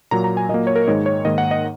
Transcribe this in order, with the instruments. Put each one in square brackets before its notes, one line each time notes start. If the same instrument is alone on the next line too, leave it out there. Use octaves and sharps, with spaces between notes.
[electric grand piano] A#2 F#3 A#3 A#5
A#5
G#5
A#2 F#3 A#3 D#5
C#5
A#4
G#2 D#3 G#3 C#5
C#5
G#2 D#3 A#3 D#5
F#5
D#5